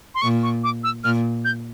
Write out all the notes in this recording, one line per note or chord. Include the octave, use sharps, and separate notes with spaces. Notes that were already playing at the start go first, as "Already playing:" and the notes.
C6
A#2 C#6
C#6
D6
E6
A#2 F6
G6